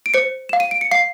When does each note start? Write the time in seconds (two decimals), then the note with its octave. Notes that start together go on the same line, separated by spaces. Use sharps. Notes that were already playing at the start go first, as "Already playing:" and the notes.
0.06 D7
0.14 C5 C#7
0.49 F5 E7
0.60 D#7
0.71 D7
0.81 C#7
0.91 F5 C7